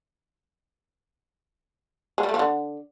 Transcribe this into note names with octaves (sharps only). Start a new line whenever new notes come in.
G#3
G3
A3
F3
D3